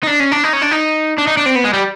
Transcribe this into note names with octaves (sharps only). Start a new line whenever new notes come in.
D#4
D4
C#4
D4
D#4
C#4
D4
D#4
D4
D#4
D4
C4
B3
G#3
G3